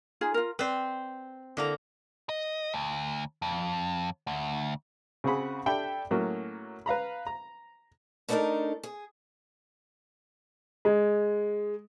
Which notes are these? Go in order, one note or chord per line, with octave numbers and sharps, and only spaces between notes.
D#4 F4 G#4
F4 A#4
C4 B4 C5 D5
D3 A#3 E4 A#5
D#5
D2
F2
D2
C#3 C4 F#4 G#4 F#5 B5
D4 G4 A4 E5 G5 B5
A2 F#3 A#3 C#4
B4 F5 A#5 B5
A#5
A3 B3 D4 D#4 A4 A#4
G#4
G#3